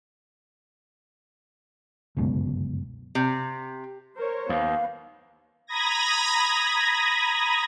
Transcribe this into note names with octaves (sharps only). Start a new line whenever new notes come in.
G1 C#2 F#2 B2
C3
A#4 C5 C#5
D#2 B3 F5
A#5 B5 D#6 G#6 A#6